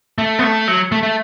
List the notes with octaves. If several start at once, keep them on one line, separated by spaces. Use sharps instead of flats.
A3
B3
A3
F#3
A3
A3